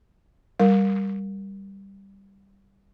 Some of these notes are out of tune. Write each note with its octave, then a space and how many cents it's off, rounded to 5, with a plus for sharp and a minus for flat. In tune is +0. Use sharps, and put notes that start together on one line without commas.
G3 +0 A#4 +5